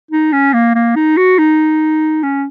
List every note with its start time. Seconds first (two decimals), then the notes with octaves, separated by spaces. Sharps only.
0.11 D#4
0.33 C#4
0.53 A#3
0.75 A#3
0.96 D#4
1.17 F#4
1.39 D#4
2.23 C#4